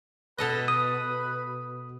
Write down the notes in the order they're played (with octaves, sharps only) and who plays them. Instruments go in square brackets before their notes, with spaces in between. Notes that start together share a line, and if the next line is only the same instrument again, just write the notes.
[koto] B2 A4 D#5 [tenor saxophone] B4
[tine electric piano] D#6